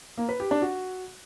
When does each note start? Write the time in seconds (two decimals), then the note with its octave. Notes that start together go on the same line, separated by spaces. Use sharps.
0.18 A#3
0.29 B4
0.40 G4
0.51 D4
0.62 F#4